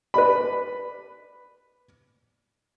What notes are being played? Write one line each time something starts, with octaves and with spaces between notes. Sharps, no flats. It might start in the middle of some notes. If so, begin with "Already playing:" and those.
B4 D5 B5